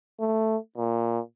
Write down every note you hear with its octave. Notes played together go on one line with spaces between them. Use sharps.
A3
A#2